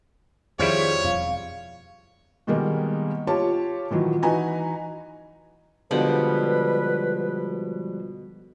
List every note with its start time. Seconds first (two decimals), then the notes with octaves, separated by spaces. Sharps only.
0.59 F2 D#3 F3 G3 E4 G#4 C#5
1.04 E1 F2 F5
2.47 B2 D#3 G3 G#3 A#3
3.27 F4 G4 C#5 A5
3.90 A#2 D#3 E3 F#3
4.23 E3 D#4 F#4 B4 G#5 A#5
5.91 B2 D3 F3 G3 G#3 B4 F#5